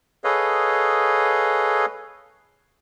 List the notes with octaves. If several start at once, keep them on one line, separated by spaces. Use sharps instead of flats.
G#4 A4 B4 C#5 D#5 F5